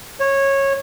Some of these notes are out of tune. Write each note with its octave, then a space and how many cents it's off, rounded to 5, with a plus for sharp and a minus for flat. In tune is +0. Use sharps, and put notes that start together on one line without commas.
C#5 -15